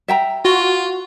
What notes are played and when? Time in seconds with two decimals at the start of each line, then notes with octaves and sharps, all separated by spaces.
0.08 E5 G5 A#5
0.45 F4 F#4